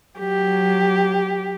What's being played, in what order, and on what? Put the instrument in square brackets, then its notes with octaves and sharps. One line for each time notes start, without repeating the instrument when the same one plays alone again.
[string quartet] F#3 G4